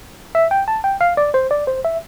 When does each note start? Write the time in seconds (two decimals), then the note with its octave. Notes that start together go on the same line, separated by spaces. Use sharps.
0.35 E5
0.51 G5
0.68 A5
0.84 G5
1.01 F5
1.17 D5
1.34 C5
1.51 D5
1.67 C5
1.85 E5